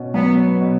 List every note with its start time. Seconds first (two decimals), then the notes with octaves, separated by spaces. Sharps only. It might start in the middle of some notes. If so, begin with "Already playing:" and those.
Already playing: B2 C#4
0.14 F#3 B3
0.61 B2